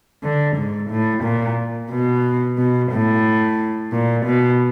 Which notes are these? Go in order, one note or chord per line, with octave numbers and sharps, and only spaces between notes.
D3
G#2
A2
A#2
B2
B2
A2
A#2
B2